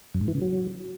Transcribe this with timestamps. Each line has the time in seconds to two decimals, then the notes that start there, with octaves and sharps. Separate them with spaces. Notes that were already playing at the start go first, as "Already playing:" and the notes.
0.14 F#2
0.21 G#2
0.28 E3
0.35 C#3
0.42 F#3